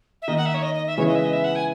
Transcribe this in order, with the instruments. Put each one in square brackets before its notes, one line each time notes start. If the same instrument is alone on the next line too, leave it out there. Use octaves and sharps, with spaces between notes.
[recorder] E5
[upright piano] D#3 A#3 D#4 [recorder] D#5
[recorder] F#5
E5
C#5
D#5
D#5
E5
[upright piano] C#3 E3 G#3 B3 E4 [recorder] C#5
[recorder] D#5
E5
D#5
E5
F#5
G#5